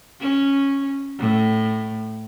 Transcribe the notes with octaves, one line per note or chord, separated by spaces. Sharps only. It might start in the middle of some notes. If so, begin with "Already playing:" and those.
C#4
A2